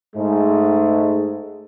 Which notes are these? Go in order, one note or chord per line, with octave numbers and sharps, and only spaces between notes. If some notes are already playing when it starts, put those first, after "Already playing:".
G#2 G#3 A3